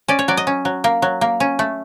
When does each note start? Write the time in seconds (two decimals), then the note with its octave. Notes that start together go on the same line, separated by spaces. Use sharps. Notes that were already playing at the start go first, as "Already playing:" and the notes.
0.08 C#4 D5
0.19 C#5
0.28 F#3 D5
0.37 D#5
0.47 C#4
0.65 F#3
0.84 A#3
1.02 F#3
1.21 A#3
1.40 C#4
1.59 A3